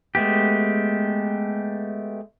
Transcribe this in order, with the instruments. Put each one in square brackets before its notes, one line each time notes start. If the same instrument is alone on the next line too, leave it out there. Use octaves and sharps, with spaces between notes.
[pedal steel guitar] G#3 A3 B3 G4